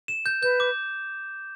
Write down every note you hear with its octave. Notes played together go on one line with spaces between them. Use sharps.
E7
G6
B4 G6
D6